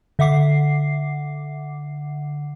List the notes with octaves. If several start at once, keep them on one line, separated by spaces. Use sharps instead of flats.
D3 E5 F#5 D6 C7